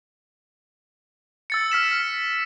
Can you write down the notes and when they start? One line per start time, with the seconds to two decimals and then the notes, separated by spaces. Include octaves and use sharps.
1.50 E6 A6 C#7
1.72 F6 B6 E7